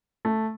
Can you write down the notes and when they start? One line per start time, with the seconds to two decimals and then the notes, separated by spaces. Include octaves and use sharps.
0.25 A3